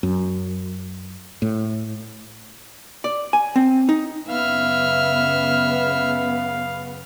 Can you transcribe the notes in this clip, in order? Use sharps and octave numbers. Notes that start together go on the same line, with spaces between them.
F#2
A2
D5
G#5
C4
D#4
F#2 C#3 B3 E5 F5 F6